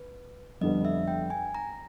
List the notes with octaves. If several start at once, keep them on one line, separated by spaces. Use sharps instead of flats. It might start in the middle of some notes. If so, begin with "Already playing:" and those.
Already playing: B4
F2 D3 G3 B3 D#5
E5
G5
G#5
A#5